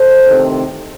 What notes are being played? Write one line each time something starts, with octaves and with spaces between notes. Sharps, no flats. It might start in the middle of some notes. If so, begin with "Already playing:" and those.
Already playing: A4 C5
E2 C3 D#3 A3 C4